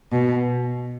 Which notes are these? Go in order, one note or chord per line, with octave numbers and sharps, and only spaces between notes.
B2